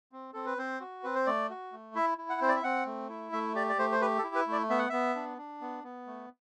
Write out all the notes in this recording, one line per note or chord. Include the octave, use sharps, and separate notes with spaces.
C4
C4 A4
B4
C4 C5
F#4
C4 B4
C5
A3 D5
F#4
A3
E4 E5
E4
F#5
C4 C5
D5
E5
C4 F#5
A3
E4
A3 E5
G4 D5
D5
A3 C5
C5
G4 B4
A4
E4
B4
A3
D5
B3 E5
F#5
B3 E5
D4
D4
B3
B3
A3